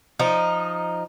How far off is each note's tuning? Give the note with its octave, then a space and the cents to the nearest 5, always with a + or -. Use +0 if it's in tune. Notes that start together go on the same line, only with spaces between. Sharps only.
F3 +0 D#4 +0